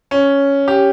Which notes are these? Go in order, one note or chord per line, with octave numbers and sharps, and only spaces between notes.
C#4
G4